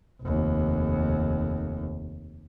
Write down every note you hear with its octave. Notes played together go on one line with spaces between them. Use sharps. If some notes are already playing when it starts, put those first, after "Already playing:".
F1 D#2